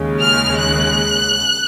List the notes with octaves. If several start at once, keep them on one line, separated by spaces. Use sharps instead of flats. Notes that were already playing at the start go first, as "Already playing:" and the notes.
Already playing: D#2 C#3 G#3
F6
F#6